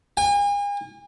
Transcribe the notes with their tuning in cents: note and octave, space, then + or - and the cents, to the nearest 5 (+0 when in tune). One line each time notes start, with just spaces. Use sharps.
G#5 -40